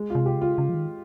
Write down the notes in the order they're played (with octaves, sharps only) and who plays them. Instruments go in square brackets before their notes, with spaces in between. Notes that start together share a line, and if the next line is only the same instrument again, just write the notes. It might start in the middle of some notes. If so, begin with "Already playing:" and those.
Already playing: [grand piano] G#3
[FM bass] C3 [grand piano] F4
[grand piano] G4
[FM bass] C#3
[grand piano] F4
[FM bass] C#3
F3
D#3